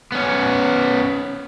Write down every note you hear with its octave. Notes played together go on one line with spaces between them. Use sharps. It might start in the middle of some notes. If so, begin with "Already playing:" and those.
B3 C#4